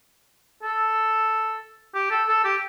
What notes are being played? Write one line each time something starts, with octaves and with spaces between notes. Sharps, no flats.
A4
G4
A4
A4
G4